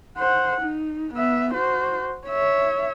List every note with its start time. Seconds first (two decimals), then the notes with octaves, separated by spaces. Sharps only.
0.18 C5 F#5
0.61 D#4
1.14 B3 E5
1.54 F#4 C5
2.27 C#5 E5